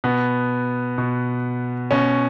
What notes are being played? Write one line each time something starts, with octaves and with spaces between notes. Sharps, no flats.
B2 B3
B2
B2 C#4